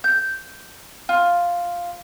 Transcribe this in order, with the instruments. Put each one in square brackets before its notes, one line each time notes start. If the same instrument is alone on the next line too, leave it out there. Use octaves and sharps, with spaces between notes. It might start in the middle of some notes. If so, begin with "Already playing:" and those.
[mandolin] G6
F4